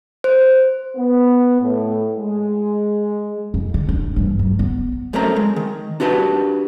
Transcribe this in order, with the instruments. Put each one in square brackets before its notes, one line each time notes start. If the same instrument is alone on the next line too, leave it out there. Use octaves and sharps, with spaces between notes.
[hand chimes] C5
[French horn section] B3
A2
G#3
[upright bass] F2
D3
D4
G2 E3
F#3
B3
[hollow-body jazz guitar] F#2 A3 A#3 C4 C#4 A#5
G#3
D#3
D4 F#4 G4 B4 A5